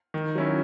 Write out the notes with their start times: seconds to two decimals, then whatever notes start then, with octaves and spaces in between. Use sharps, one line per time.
0.14 D#3
0.35 F#3 C#4 E4